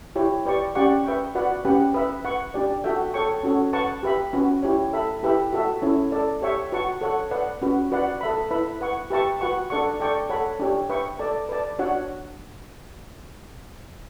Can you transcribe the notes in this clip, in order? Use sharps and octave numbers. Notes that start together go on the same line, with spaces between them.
E4 G4 C#5
G4 B4 D5 G5 C#6
C#4 G4 D5 F#5 C#6
B4 E5 G5 C#6
F#4 B4 D5 F#5
C#4 G4 B4 F#5
B4 E5 B5
B4 F#5 C#6
D4 G4 D5
F#4 A4 E5 G5
A4 C#5 G5 C#6
C#4 F#4 A4 C#5
B4 F#5 A5 C#6
G4 B4 E5 B5
C#4 F#4 B4
E4 G4 C#5
A4 E5 B5
E4 G4 B4 E5 B5
F#4 A4 E5
C#4 E4 A4 C#5
A4 D5 A5
G4 C#5 E5 G5 C#6
F#4 B4 F#5 A5 C#6
A4 C#5 F#5 C#6
B4 D5 F#5
C#4 F#4 B4
F#4 B4 D5 F#5
A4 E5 B5
E4 B4 E5 B5
B4 F#5 C#6
G4 B4 E5 A5 C#6
F#4 B4 F#5 C#6
D4 A4 D5 F#5 C#6
A4 D5 G5 C#6
A4 C#5 F#5 B5
D4 G4 C#5
B4 E5 G5 C#6
A4 D5 A5
B4 D5 A5
D4 F#4 C#5 F#5